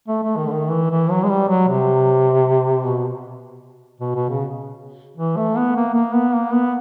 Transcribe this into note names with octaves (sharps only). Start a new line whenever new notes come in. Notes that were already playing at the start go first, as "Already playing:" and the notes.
A3
A3
D#3
D3
D#3
E3
E3
F#3
G#3
G3
F#3
C3
B2
B2
B2
C#3
E3
A3
B3
A#3
A#3
B3
A#3
B3